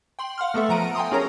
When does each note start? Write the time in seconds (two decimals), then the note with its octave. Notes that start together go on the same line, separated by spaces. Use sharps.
0.19 G5 C6 F#7
0.38 F5 F#5 C6 F6
0.54 A3 B3 A4 E5
0.69 F3 F#5 A#5 D7 D#7
0.95 G5 G#5 A#5 C6 D#6
1.12 C#4 F#4 G#4 A#4 C#5 A#5